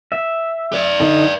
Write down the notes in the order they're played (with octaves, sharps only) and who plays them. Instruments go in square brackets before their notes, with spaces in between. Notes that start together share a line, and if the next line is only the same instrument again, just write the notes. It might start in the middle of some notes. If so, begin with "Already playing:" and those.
[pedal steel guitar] E5
[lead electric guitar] B4 D5
[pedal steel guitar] D3 D#4